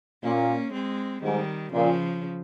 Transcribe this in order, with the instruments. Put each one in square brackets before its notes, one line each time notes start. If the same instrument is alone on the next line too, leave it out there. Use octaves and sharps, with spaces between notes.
[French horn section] A#2 [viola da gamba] A#3 C#4
[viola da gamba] G#3 C4
[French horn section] G#2 [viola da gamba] D#3 G3
[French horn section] A#2 [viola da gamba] C#3 F3